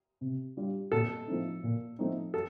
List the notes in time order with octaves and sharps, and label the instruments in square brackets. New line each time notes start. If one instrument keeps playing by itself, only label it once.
[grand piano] C3
G3 D4 F4
[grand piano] A#2 [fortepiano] A4
[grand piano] F3 A3 C4 D#4
A#2
F3 A3 C4 D#4
[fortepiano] A4